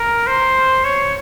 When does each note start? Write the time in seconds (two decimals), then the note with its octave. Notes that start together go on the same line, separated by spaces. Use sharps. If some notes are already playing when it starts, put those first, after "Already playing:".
Already playing: A#4
0.27 C5
0.85 C#5